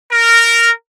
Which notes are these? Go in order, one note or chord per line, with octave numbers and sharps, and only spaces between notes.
A#4